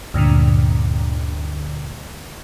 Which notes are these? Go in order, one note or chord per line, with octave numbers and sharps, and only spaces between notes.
D2 G2 A#2 D3